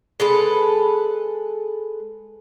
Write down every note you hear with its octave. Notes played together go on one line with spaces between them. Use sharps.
G#3 A4 B4